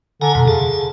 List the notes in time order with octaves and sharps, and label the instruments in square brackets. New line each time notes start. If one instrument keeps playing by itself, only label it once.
[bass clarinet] D3 [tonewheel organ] G#5 A#5
[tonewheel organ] F2 B2
[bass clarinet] C#3 [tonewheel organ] A5